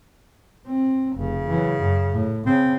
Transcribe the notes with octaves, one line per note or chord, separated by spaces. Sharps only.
C4
F1 C#3
E3 F#3
F#2
A2
C#3 C4